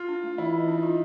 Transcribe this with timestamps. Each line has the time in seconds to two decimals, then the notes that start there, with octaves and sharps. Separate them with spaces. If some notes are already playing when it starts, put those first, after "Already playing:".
Already playing: F4
0.08 D4
0.23 A3
0.38 E3 E4
0.53 E3 D#4
0.68 D4
0.78 D#4
0.83 F4